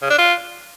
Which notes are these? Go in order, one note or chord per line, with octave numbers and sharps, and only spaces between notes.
C#3
D4
F4